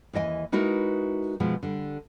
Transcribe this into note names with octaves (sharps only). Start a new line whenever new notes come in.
D#2 E3 D#5 G5 G#5
G#3 D#4 E4 F#4 A#4 B4
B2 D#3 F3 G#3
D3 G3